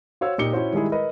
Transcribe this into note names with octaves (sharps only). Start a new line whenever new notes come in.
F#4 C5 C#5 F5 E6
A#2 D#4 G4 C#7 G7
C#4 E4 F#4 C5
D#3 G3 G#3 E4 G#4
A#4 B4 D#5